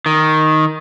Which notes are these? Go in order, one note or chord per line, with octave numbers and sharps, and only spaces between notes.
D#3